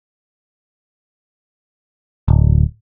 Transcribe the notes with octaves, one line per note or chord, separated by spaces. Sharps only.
D1